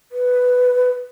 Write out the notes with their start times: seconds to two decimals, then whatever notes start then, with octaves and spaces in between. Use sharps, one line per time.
0.12 B4